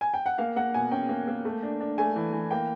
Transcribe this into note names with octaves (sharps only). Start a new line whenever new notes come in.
G#5
G5
F#5
A#3 F5
A#3 F#5
B2 G#5
C#4 G5
A#3
A#3
A3
D4
D4
A3 G#5
E3
E3
A#3 G5